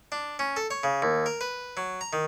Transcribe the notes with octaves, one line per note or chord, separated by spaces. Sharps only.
D4
C#4
A4
C#5
C#3
D#2
A#4
B4
F#3
A#5
D#3